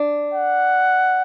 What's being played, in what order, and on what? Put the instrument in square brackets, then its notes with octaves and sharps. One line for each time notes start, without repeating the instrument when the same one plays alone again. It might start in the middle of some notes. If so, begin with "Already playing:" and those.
Already playing: [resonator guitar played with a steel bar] D4
[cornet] F#5